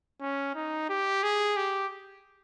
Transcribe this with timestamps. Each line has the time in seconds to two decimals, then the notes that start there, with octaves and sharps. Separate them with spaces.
0.21 C#4
0.55 D#4
0.90 G4
1.23 G#4
1.57 G4